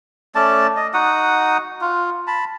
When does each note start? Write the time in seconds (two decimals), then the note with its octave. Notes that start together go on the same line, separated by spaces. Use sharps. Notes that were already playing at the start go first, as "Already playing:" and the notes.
0.35 A3 C#4 D5 A5
0.76 D#5
0.94 D#4 F#4 F#5 D#6
1.81 F4
2.27 A5 B5